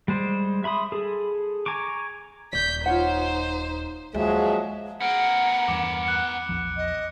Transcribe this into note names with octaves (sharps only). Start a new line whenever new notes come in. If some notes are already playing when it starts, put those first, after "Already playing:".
G3 G#3 C5
E5 B5 C6 D#6
G#4 A4
G#5 A#5 C#6 D6
D#1 D5 G6 B6
D#4 F4 C5 C#5 F#5
D#2 F3 F#3 G#3 E5
B3 A#4 F#5 C#7 D7
E2 G2 D6
F#6 C#7
A#1 E2 F3
D#5